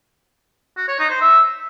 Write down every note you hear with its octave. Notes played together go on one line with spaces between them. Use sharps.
F#4
C#5
D#4
C5
E5